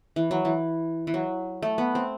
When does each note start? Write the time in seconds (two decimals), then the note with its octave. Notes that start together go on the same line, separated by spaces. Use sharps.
0.16 E3
0.31 F#3
0.45 E3
1.07 E3
1.14 F#3
1.62 A3
1.78 B3
1.95 C4